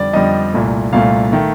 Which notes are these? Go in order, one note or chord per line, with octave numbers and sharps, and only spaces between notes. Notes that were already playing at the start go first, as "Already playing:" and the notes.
Already playing: F2 D3 G3 D5
F2 D3 G3 D#5
C2 A#2 A3
C2 A#2 A3 F5
D#3 A3